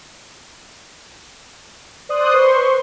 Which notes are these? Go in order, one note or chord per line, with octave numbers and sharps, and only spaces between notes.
C5 D5 C6 D#6 F#6
B4 C5 C6 C#6